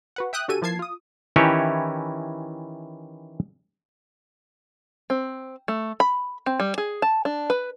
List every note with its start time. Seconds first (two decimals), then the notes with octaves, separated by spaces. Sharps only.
0.16 F#4 B4 F#5
0.33 E5 G5 D#6 F#6
0.48 D3 F#4 G4 A4 G#5 D#7
0.61 E3 F3 A#3 A5 G#6 C7
0.79 F4 D#6
1.36 D#3 E3 C#4 E4 G4 C#5
5.10 C4
5.68 A3
6.00 B5
6.46 C4
6.60 G3
6.78 G#4
7.02 A5
7.25 D4
7.50 B4